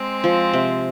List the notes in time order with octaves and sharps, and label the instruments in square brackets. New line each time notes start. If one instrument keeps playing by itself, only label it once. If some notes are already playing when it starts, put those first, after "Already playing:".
Already playing: [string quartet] G#3 C4
[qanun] F3
C3